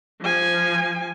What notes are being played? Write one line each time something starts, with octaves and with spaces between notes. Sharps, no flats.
F3 G#5